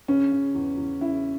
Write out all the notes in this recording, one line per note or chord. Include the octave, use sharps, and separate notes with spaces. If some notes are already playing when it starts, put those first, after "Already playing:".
C#3 C#4
C#3
E2
E2
C#3 E4